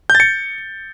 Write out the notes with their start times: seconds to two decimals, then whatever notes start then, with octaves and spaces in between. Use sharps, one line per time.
0.10 G6
0.15 A6
0.20 C#7